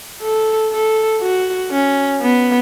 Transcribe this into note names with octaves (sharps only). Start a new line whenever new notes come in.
A4
A4
F#4
C#4
B3